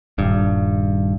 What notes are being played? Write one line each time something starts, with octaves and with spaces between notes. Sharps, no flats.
D#1 G2